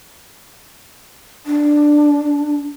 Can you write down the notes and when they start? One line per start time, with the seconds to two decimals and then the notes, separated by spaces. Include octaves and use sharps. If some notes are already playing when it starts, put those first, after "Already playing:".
1.46 D4